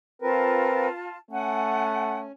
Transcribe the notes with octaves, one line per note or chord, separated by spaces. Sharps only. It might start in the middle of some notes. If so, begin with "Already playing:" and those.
C4 F4 A#4 B4 A5
A3 C#4 F#5 G#5